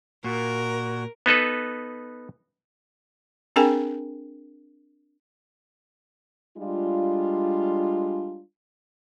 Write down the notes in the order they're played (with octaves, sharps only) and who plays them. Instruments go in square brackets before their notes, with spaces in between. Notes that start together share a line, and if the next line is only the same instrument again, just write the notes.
[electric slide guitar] A#2 [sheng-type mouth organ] F#4 [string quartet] A#4
[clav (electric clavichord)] B3 D#4 A4 B4
[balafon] C4 D4 G#4 A#4 G5 G#5
[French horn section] G3 G#3 D4 F4